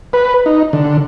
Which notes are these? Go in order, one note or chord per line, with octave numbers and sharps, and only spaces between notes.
B4
D#4
D3